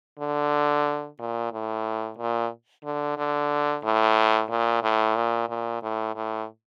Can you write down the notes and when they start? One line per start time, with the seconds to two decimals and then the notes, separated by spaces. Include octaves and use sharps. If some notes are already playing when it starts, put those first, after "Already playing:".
0.19 D3
1.19 A#2
1.52 A2
2.18 A#2
2.84 D3
3.17 D3
3.83 A2
4.50 A#2
4.83 A2
5.16 A#2
5.49 A#2
5.83 A2
6.15 A2